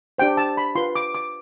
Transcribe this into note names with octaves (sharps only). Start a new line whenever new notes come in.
D4 G4 C5 G5
A5
B5
F4 B4 C6
D6
D6